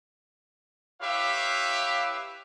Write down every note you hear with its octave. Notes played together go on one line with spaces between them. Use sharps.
E4 G4 B4 C#5 E5 F5